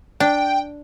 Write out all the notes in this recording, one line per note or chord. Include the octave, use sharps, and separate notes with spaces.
D4 G5